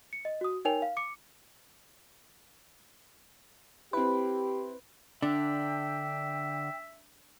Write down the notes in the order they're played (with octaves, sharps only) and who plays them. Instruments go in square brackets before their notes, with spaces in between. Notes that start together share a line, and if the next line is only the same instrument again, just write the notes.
[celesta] C#7
D#5
F#4 D#6
D#4 A#4 C#5 G5 G#5 F7
F5
D6 C#7
[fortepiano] C4 E4 [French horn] G4 [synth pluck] B4
[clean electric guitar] D3 [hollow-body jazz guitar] D4 [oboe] E5 [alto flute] G5